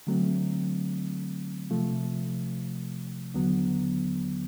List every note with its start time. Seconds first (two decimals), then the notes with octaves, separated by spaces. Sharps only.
0.07 D3 F#3 A3 C4
1.71 C3 F3 A3
3.34 D#2 D3 F#3 B3